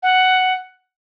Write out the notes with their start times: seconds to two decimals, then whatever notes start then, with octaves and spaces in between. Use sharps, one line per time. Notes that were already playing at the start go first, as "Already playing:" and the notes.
0.03 F#5